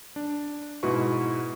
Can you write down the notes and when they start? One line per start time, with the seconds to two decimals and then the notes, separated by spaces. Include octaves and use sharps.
0.16 D4
0.83 G#2 B2 E4 F#4 B4 C#6